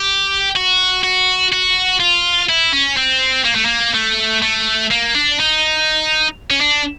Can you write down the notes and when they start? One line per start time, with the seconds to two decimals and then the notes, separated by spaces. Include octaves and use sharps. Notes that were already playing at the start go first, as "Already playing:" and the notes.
Already playing: G4
0.56 F#4
1.03 F#4
1.52 F#4
2.00 F4
2.49 E4
2.73 C#4
2.97 C4
3.45 A#3
3.56 A3
3.66 A#3
3.94 A3
4.42 A3
4.91 A#3
5.15 D4
5.40 D#4
6.51 C#4
6.61 D4